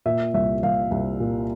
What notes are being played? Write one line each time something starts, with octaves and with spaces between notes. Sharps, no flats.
A#2 E5
C2 E5
C2 F5
C2
A#2